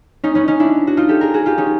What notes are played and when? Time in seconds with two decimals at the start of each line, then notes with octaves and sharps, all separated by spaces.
0.24 C#4 D#4
0.35 B3 C#4
0.48 C#4 D#4
0.60 D4 E4
0.87 F#4
0.97 D#4 F4
1.09 G4 A4
1.21 G#4 A#4
1.34 F#4 G#4
1.46 F4 G4
1.58 C#4 D#4